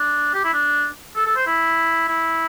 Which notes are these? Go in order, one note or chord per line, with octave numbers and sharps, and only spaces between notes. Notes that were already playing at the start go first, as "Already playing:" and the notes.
Already playing: D4
G4
E4
D4
A4
A4
C5
E4
E4